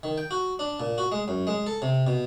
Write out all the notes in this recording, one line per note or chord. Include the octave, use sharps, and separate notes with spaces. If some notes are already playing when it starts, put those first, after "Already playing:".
D#3
G5
F#4
D4
A#2
F#4
G#3
F#2
G#3
A4
C3
B2